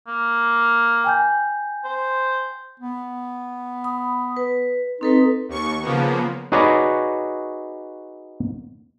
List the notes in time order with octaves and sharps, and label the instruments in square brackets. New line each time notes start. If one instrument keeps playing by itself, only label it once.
[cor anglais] A#3
[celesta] G5 G#5 G6
[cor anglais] C5
[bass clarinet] B3
[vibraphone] B5 D#6
B4
[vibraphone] C4 A4 B4 [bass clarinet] D#4
[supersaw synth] D#2 C#6
C#3 F3 A#3 B3
[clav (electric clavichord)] D#4 F#4 G#4 B4 C#5 D5